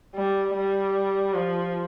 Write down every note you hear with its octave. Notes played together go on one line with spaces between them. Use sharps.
G3
G3
F3